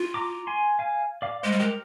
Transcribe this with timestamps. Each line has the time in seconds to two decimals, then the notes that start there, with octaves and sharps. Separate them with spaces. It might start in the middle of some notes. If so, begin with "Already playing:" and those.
Already playing: F4
0.14 A#5 D6
0.47 G#5 C6
0.79 F5 G#5
1.22 D5 F5
1.43 G#3 C5 D#5
1.52 G3
1.59 G#3 G4 A#4